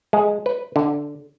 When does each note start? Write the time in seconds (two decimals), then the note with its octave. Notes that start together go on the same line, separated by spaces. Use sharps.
0.13 G#3
0.46 B4
0.76 D3